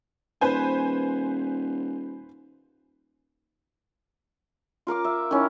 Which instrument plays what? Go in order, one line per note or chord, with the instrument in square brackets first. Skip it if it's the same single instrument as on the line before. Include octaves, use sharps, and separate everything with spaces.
[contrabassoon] D#1 [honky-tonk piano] B4 C5 G#5
[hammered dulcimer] F4 A#4 F5 D6
E5
D#3 C#4 E4